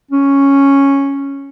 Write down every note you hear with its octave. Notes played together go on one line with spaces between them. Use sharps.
C#4